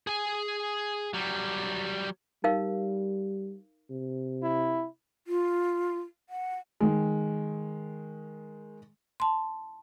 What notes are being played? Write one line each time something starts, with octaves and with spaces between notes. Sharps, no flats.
G#4 G#5
F#3 G3
G3 D#4 A#4 F5
C3
E4
F4
F#5
D#3 G#3
A5 C6